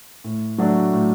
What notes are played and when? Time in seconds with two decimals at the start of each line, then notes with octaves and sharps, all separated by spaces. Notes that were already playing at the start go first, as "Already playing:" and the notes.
0.24 A2
0.58 F#3 A3 D4 F#4
0.93 A2